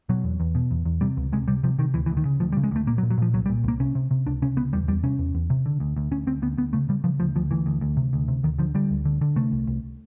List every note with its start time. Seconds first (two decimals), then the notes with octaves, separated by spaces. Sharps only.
0.09 B2 F#3
0.24 E2
0.40 E2
0.55 B2
0.71 E2
0.85 E2
1.01 C3 G3
1.17 C#2
1.32 C3 G#3
1.48 C3 G3
1.63 C3 F3
1.79 C3 D#3
1.94 D2 E3
2.06 E3
2.10 D2
2.17 D#3
2.25 C#3
2.40 D2 F3
2.52 G3
2.57 C#3
2.63 G#3
2.71 D2 A3
2.87 A#2 A#3
2.98 F#3
3.02 A#2
3.10 F#3
3.18 A#2 F3
3.33 C2 F#3
3.46 G3
3.49 A#2
3.64 C2 A#3
3.80 C3 C#4
3.95 C3
4.11 C3
4.26 C#2 D4
4.42 C3 C#4
4.56 C#2 B3
4.73 E2 G3
4.88 E2 G3
5.04 C3 C#4
5.19 E2
5.35 E2
5.50 C3
5.66 D3
5.80 D2
5.97 D2
6.11 D2 C#4
6.27 D2 C4
6.42 D2 B3
6.57 D2 B3
6.73 C#3 A3
6.89 C#3 G3
7.04 C#3 F3
7.20 D2 F3
7.36 D2 F3
7.51 D2 E3
7.66 D2
7.81 D2
7.97 C3
8.13 D2
8.28 C3
8.43 D2 D#3
8.58 D3 F3
8.74 D3 G3
8.90 D2
9.05 D3
9.21 D3
9.36 C3 A3
9.52 C2
9.67 C2